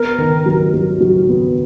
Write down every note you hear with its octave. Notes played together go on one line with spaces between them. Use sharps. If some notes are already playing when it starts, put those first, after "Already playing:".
Already playing: B3 A#4
D#3
F#3
F#3
F#3
B3